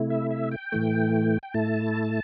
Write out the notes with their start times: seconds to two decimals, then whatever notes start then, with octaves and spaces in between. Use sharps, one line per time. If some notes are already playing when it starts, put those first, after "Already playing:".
Already playing: C3 A3 E4
0.10 E5
0.31 E5
0.51 G5
0.72 A2 E3 A3
1.43 G5
1.54 A2 A3 E4 A5